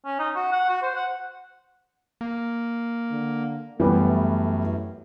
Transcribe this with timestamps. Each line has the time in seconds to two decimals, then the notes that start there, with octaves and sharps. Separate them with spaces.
0.05 C#4
0.19 D#4
0.35 F#4
0.52 F#5
0.69 F#4
0.82 C5
0.95 F#5
2.21 A#3
3.11 D3
3.80 F#2 E3 G3 A3 B3